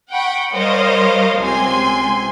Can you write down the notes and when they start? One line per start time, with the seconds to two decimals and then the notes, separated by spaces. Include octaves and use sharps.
0.11 F#5 G5 B5 C#6
0.54 G3 A#4 C5 C#5 D#5 F5
1.40 C#2 C3 G#5 C6